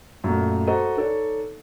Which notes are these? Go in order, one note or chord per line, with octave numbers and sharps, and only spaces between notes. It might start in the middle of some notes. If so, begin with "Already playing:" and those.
F#2 A#2 A3
F#4 A4 C5 D#5 A#5
D#4 A4 C#5 D5